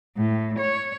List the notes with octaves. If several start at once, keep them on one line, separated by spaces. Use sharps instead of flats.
A2
C#5